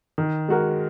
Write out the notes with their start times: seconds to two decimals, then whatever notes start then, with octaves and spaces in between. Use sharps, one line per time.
0.18 D#3
0.49 G#3 F#4 A#4